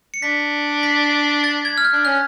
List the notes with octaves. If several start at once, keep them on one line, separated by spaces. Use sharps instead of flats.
C#7
D4 B6
B6
A6
G#6
F6
F#6
D4
C#4 F#6